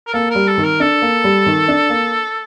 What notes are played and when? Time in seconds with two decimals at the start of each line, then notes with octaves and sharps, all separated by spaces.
0.07 A#4
0.14 A#3 A4
0.30 G3 A#4
0.47 A4
0.58 D#3
0.63 A#4
0.80 D4 A4
1.02 A#3
1.24 G3
1.46 D#3
1.68 D4
1.90 A#3